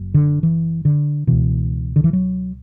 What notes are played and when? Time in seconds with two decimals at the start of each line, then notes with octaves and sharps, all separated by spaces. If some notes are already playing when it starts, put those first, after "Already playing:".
Already playing: F#1 F#2
0.14 D3
0.43 E3
0.85 D3
1.27 C#2 B2 E3
1.96 D3
2.04 E3
2.13 F#3